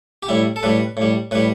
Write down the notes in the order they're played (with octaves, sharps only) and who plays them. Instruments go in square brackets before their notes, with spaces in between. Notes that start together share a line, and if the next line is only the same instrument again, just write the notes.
[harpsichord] G4
A2 G3 E4
A4
A2 G3 B4
A2 G3
A2 G3 B4